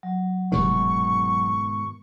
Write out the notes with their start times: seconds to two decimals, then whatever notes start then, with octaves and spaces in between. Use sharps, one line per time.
0.03 F#3
0.52 F1 G#2 B2 D#3 C#6